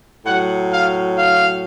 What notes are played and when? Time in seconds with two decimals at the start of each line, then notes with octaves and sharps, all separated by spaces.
0.23 A2 F#3 F#5
0.71 F5
1.17 F5